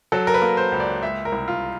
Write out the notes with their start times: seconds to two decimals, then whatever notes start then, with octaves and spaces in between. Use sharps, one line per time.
0.12 F#3 A4
0.27 A#4
0.34 B4
0.42 A#3
0.57 C5
0.72 C#2
0.80 D5
1.02 G#3 E5
1.25 A#4
1.32 C2
1.48 F4